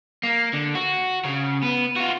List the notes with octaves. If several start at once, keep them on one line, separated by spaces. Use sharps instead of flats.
A#3
D3
F#4
C#3
B3
F4 F#4